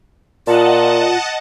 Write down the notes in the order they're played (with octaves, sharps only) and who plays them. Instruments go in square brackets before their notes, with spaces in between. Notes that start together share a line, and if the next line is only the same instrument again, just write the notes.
[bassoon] A#2 [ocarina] F4 [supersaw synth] D#5 F#5 A5